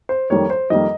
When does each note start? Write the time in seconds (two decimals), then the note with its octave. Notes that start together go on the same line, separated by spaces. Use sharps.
0.09 C5
0.30 F2 D#3 G3 A#3 C#5
0.50 C5
0.70 F2 D#3 G3 A#3 D#5